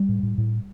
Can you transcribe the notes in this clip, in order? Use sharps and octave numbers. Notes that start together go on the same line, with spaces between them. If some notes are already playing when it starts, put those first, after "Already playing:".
Already playing: G3
A2
A2
A2